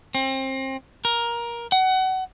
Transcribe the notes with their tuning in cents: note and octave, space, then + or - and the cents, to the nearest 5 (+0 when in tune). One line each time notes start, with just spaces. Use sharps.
C4 +30
A#4 +15
F#5 +25